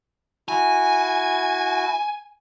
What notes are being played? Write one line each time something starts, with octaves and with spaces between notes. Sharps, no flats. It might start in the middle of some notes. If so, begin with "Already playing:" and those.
E4 F#4 G#5